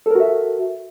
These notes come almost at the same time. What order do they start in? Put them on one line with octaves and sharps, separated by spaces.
A4 A#4 F#4 E5